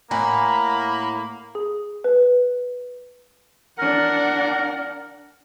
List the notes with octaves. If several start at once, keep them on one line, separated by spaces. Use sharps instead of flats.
A2 A#3 F#5 G#5 A#5 B5
G#4
B4
D4 A#4 F#5